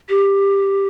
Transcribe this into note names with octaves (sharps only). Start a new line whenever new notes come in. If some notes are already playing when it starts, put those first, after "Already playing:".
G4